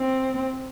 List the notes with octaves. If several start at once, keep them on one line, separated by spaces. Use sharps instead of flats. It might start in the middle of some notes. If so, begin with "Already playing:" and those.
Already playing: C4